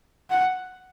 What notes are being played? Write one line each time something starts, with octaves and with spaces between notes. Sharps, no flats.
F#5